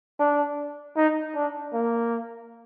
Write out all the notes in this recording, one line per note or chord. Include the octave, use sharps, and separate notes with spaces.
D4
D#4
D4
A#3